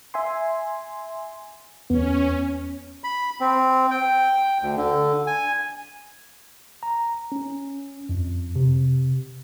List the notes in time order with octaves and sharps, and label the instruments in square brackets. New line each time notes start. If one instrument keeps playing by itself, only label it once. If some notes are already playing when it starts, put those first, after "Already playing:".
[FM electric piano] E5 G#5 C6
[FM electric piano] E2 B3 [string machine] C#4
[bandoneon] B5
C4
G5
D2
D3
G#5
[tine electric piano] A#5
C#4
F2
C3